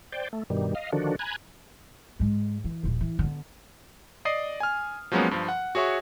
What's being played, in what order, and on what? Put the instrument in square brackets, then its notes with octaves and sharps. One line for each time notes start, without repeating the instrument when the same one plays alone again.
[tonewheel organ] C5 D5 G5
A3
G2 B2 D#3 G3
D#5 F5
D3 D#3 F3 D4 F#4
G#5 A#5 B5 F#6 G#6
[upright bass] G#2 G#3
E3
D#1 A#1
E3
D3 B3
[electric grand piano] D5 D#5 D#6 C7
G#5 F6
F3 F#3 G#3 A#3 B3 C#4
G2 F3
F#5
F#4 G#4 C#5 E5 C#6